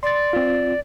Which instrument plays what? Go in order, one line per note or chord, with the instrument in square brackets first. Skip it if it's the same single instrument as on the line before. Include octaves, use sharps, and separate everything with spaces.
[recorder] D5 [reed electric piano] C6 A6
[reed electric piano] C4 F4